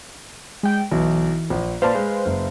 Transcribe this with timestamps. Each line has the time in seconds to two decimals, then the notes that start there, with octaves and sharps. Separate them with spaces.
0.63 G#3 G5
0.92 B1 E3
1.50 A#1
1.82 A#2 B4 C5 D5 F5 A5
1.95 G#3
2.26 F#1